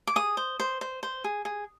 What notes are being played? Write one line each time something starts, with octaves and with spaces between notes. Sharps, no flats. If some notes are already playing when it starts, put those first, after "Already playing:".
D6
G#4 D#6
C5
C5
C5
C5
G#4
G#4